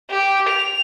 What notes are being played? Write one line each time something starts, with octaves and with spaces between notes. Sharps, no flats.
G4
F7